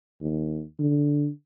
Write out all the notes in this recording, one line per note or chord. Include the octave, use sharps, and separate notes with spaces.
D#2
D3